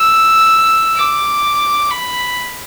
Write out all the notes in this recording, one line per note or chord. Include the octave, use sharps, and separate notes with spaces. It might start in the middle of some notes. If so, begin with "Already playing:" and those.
Already playing: E6
D6
B5